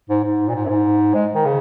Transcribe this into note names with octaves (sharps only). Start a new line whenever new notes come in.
G#2
G#2
A#2
G#2
F#2
G#2
G#3
D#3
C#3